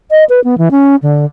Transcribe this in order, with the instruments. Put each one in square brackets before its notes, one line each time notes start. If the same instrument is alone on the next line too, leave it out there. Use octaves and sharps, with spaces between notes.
[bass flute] D#5
B4
B3
E3
C#4
D3